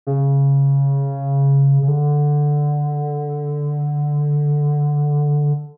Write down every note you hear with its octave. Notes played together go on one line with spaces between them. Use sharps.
C#3
C#3
D3